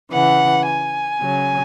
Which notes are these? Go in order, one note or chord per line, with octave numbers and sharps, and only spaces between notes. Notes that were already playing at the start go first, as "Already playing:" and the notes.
C#3 E3 F#5
G#5
C#3 F#3